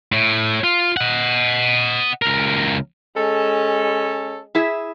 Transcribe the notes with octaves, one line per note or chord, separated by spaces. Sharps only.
A2
F4
D#5 F#5
C#2 A#4
G#3 C#4 A4
E4 G#4 E5